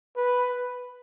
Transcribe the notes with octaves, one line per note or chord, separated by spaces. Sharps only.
B4